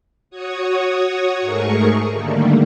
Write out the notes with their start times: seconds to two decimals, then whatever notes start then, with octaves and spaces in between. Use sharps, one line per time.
0.30 F#4 C#5 C#6 D#6
1.40 G#2 A3 G#4 A#4 C#6
2.10 D3 D#3 G3 A3 A#3